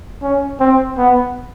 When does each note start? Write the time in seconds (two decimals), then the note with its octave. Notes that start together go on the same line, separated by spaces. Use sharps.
0.22 C#4
0.60 C4
0.98 B3